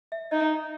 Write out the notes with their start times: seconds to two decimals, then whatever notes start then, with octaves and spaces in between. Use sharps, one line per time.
0.12 E5
0.31 D#4 D#5